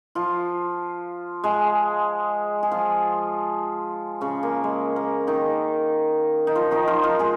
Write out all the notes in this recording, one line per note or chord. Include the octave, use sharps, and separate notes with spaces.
F3 F4
G#3 G#4
G#4
F3 F4
C#3 C#4
A#3
G#3
A#3
D#3 D#4
D#4
F3 F4
D#3 D#4
F3 F4
F3 F4
G#3 G#4